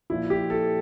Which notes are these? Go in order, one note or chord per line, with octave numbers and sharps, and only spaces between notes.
A#2 F3 E4
G4
A4